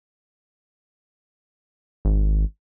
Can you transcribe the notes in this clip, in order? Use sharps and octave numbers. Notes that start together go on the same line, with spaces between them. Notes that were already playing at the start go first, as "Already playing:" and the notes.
G#1